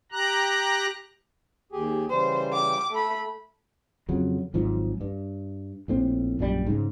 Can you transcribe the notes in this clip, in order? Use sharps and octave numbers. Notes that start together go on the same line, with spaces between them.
G4 A#5 F#6
D#2 G4 G#4
C#3 E3 G3 C5
G5 D6
A3 A4 B5
F2 C#3 F#3
G#1 G#2 F3 F#3
G2
A#1 A2 C4
A#1 F#2 C#3 G3
G#2 C#3